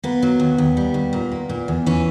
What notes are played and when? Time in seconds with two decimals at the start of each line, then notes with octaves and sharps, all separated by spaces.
0.04 A#3 B3
0.22 F#3
0.40 D#2
0.58 D#2
0.77 G3
0.94 D#2
1.13 A#2
1.31 A#3
1.49 A#2
1.68 E2
1.86 E3 C#4